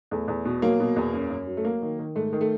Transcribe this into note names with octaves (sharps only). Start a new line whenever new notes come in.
E2 A3
E2
B2
F#3 A#3
B2
E2
F#2
F#2
F#3
A3
F#3 A#3
D#3
D#3
G#2 A3
D#3
A3